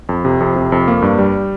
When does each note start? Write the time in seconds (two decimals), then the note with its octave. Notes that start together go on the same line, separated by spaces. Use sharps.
0.09 F2
0.25 C3
0.40 F2
0.56 C3
0.72 F2
0.88 A#3
1.02 G2
1.18 G3